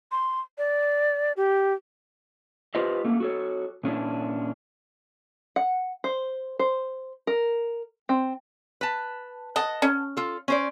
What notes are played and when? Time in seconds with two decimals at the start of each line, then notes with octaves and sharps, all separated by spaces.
0.12 C6
0.58 D5
1.37 G4
2.75 F4 G4 B4 C5 D#5
3.04 A3 A#3 C#4
3.20 F#4 A4 C#5
3.84 A#2 C#4 D4 E4
5.56 F#5
6.04 C5
6.59 C5
7.27 A#4
8.09 C4
8.81 B4 A5
9.56 D#5 F#5 A5
9.82 C#4
10.17 F4 A4
10.48 C#4 C5 D5